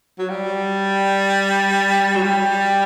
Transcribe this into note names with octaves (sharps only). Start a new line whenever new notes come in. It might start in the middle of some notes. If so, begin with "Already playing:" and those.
F#3
G3
F#3
G3